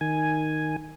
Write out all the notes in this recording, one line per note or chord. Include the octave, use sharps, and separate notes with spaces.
D#3 G#5